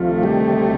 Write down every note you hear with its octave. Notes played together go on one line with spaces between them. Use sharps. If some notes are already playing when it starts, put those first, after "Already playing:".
Already playing: D2 C3 D#3 F3 A3 F4
G3 G4